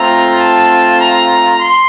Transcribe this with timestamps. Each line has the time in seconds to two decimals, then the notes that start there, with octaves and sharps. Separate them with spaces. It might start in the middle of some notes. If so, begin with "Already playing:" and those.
Already playing: A3 C4 F4 A#5
0.38 A5
0.99 A#5
1.59 C6